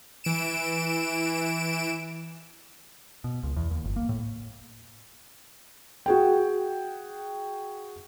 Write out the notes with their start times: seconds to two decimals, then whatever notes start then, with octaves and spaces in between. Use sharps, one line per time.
0.24 E3 D7 E7
3.24 B2
3.43 C#2
3.56 E2
3.71 D#2
3.84 G1
3.96 A#3
4.09 A2
6.06 F#4 G#4 G5